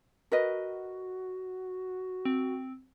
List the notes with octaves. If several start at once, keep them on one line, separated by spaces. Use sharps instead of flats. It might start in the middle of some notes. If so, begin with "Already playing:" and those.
F#4 A#4 B4 D#5
C4